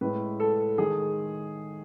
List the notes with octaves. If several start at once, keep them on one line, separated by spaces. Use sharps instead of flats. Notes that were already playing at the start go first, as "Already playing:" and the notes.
A2 G#3 B4
A4
D#3 G#3 G#4